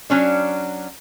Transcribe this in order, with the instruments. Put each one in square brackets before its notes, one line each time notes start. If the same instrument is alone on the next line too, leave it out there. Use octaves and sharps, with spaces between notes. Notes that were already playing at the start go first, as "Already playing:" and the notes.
[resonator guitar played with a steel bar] F#3 C#4 D4